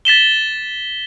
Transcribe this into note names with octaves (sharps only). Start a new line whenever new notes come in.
A6 B6 E7 G7